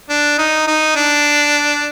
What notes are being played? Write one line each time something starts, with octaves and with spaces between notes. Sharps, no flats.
D4
D#4
D#4
D4